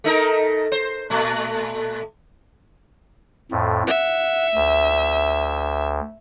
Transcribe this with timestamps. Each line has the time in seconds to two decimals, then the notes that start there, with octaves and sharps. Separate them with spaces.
0.04 A3 D#4 A#4
0.72 C5
1.10 A#2 A3
3.51 F2 A2
3.87 E5 F#5
4.55 D2